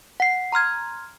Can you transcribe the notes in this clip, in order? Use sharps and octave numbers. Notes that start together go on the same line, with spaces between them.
F#5 C7
A#5 C6 F6 G#6